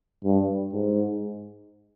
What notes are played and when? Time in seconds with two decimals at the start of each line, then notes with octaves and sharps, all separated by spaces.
0.24 G2
0.73 G#2